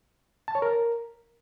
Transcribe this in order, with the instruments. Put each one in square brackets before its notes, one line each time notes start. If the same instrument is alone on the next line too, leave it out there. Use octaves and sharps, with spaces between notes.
[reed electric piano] A5
C#5
A#4